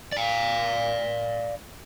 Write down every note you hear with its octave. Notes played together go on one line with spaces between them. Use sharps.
D5 F5